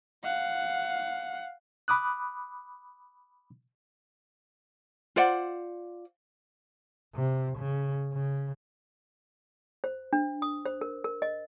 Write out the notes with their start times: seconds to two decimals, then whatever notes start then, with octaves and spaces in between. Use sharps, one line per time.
0.23 F5 F#5
1.88 B5 D6 D#6 F#6
5.16 F4 C5 D5 F#5
7.15 C3
7.58 C#3
8.13 C#3
9.84 C5
10.13 D4
10.42 D#6
10.66 C5
10.81 A#4
11.04 A#4
11.22 D#5